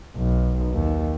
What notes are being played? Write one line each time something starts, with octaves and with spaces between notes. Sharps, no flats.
B1
D#2